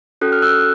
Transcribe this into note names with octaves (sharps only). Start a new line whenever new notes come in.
C#4 F#4 A4 F#6
F6
E6 F#6